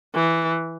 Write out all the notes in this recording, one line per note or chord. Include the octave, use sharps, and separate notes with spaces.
E3